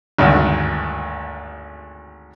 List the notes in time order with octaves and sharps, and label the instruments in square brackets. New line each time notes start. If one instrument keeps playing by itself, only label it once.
[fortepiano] G#1 D2 G2